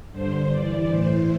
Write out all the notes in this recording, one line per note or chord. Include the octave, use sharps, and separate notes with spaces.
G2 D3 C5
G2 E3 D5
A2 E3 C5